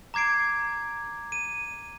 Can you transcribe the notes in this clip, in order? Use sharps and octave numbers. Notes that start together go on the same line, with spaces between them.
A#5 D6 G#6 C7 D7
D#7